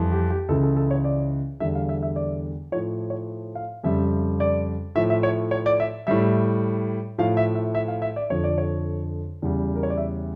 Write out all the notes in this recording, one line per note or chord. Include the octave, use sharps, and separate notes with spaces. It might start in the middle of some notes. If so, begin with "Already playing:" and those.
Already playing: F2 E3 G3
G4
G4
C#2 C#3 E3 A4
A4
A4
C#5
D5
E2 D3 G3 E5
F5
E5
E5
D5
A2 F3 C#5
C#5
F5
F2 C#3 G3 E5
D5
A2 F3 E5
E5
C#5
C#5
D5
E5
A2 G3 E5
A2 F3 F5
E5
E5
E5
F5
E5
D5
F2 D3 F3 C#5
D5
C#5
E2 C#3 E3 G3
A#4
C#5
D5
E5